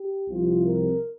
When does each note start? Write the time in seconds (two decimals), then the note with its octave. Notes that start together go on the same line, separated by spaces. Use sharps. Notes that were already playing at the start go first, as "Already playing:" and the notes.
Already playing: G4
0.28 C2 C3 F3 C4 F4
0.66 A#4